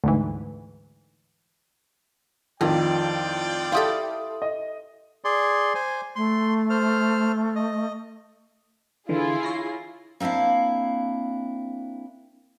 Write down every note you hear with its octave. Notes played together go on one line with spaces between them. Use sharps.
D2 G#2 E3
F2 A2 D#3 F3 F4 D5 G5
E4 G4 A4 F5 C6 D#6
D#5
G#4 D5 C6
C5 G#5
A3 C6
C5 F6
D#5
D3 E3 E4 F4 G#4
C#5 A#6 C7
A#3 C4 D4 E4 F5